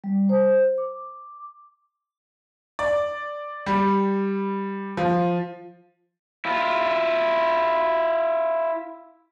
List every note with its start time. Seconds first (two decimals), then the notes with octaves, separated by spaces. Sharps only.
0.04 G3
0.29 C5
0.78 D6
2.79 D5
3.66 G3
4.97 F3
6.45 E4 F4